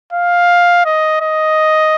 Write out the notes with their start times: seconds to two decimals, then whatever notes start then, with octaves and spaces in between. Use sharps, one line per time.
0.13 F5
0.85 D#5
1.21 D#5